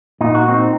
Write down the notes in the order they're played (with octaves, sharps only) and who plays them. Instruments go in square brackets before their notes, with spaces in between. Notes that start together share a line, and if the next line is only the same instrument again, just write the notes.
[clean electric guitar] A#2 D#4
F#4
C4 D#4